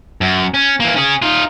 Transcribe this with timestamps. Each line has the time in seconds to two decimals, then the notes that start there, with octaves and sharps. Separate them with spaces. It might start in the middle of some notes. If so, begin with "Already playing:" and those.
0.21 F#2
0.54 C#4
0.80 E3 A#3
0.96 C#4 G#4
1.22 D#4 F4